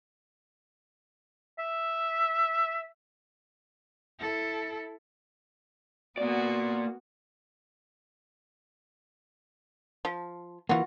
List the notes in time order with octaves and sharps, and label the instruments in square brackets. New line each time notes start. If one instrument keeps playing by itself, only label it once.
[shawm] E5
[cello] E4 A4
[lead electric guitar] A#3 D5 [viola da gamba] B3 F#4
[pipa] F3
[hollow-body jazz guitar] E3 A#3 [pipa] F4 F#4